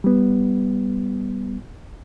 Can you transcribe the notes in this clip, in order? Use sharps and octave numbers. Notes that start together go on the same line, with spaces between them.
G3 B3